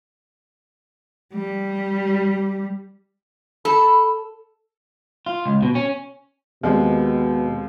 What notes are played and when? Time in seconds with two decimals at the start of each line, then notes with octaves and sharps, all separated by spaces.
1.34 G3
3.65 A4 B5
5.26 F4
5.46 C#2
5.62 B2
5.75 C#4
6.63 D#2 B2 G#3 C4